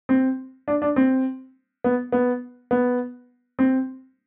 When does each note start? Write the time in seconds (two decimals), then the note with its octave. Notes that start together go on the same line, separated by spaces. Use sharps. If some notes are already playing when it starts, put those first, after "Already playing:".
0.09 C4
0.68 D4
0.82 D4
0.96 C4
1.84 B3
2.12 B3
2.71 B3
3.59 C4